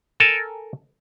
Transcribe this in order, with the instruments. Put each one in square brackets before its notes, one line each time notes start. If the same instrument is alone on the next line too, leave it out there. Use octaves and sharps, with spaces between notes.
[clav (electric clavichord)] A4 A#4 G#5 A5